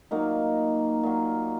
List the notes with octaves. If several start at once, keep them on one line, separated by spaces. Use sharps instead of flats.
A#2 F#3 A#3 D#4
A#2 F#3